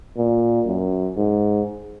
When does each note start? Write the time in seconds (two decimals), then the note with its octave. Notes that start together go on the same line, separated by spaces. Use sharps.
0.17 A#2
0.67 F#2
1.17 G#2